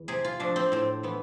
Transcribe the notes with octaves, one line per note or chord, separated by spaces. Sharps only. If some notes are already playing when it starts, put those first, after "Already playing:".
Already playing: E2
C3 G#4
F4
F3 A3 D4
C4
A2 C4
E3 B3